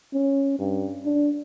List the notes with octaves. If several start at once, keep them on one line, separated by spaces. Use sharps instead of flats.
C#4
G2
D4